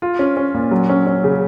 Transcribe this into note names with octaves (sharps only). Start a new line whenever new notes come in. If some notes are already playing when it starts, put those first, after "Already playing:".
F4
C#4
C#4
A#2
F#3
C#4
C#4
C#3